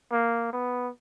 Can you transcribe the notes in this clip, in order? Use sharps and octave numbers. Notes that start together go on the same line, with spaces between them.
A#3
B3